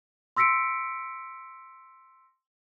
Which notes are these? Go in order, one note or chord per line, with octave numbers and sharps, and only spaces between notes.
C6 E6 A#6 B6 C#7 D7